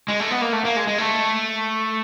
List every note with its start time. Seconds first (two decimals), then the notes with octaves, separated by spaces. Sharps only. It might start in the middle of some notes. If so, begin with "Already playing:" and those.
0.08 G#3
0.20 A3
0.31 B3
0.41 A#3
0.53 A3
0.65 A#3
0.76 G#3
0.87 G#3
0.98 A3